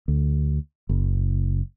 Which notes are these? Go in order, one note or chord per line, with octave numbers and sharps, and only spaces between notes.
D2
F#1